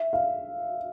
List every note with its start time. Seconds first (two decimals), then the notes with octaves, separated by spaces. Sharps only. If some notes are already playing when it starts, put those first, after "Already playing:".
Already playing: E5
0.13 F5